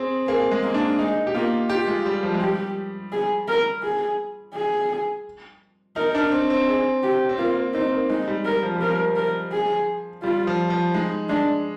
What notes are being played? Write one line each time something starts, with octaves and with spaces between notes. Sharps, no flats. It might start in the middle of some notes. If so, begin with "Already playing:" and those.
Already playing: C4 G#4
A#3 G#4
G#3
A#3
D4
G#3 D#4
G4
A#3 F4
F4 G4
G#3
G3
F3
G#3
G3 G4
G#4
A#4
G#4
G#4
D#4 A#4
D4
C4
C4
G#4
G4
C4
A#3 F4
A#3
C4 D#4
A#3
G#3 D#4
G3
A#4
F3
G3
F3 A#4
A#4
G#4
G3 F4
F3
F3
G#3 D#4
G#3 D4